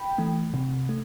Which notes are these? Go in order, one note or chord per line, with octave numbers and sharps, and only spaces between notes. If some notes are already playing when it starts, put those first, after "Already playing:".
Already playing: G5 B5
E3 A3
C3
A3